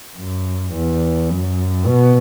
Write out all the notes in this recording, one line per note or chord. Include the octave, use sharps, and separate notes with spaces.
F#2
E2
F#2
B2